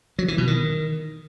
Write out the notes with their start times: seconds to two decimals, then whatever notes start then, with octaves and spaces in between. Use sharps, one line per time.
0.19 F#3
0.28 E3
0.38 B2
0.47 D#3